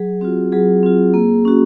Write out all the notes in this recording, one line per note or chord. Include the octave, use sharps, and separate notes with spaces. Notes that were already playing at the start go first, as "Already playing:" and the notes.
Already playing: F#3 G#4
C4 F4 F#4
F#3 G#4
C4 F4
A#3
C#4 F#4